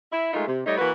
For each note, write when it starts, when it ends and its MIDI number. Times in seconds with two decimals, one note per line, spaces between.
0.12 0.33 64
0.34 0.47 56
0.34 0.47 57
0.34 0.47 63
0.34 0.47 65
0.34 0.47 70
0.48 0.61 48
0.66 0.75 55
0.66 0.75 57
0.66 0.75 63
0.66 0.75 73
0.66 0.75 75
0.78 0.91 52
0.78 0.91 58
0.78 0.91 66
0.78 0.91 71